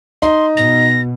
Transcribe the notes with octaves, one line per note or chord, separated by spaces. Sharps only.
D#4 C6
B2 A#6